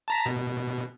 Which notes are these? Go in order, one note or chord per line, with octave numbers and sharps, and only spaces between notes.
A5 A#5 B6
B2